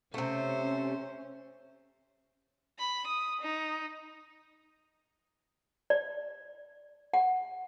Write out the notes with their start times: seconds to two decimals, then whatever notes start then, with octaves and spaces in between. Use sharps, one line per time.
0.14 C3 A3 C#4 C5
2.79 B5
3.07 D#6
3.41 D#4
5.90 D5
7.14 F#5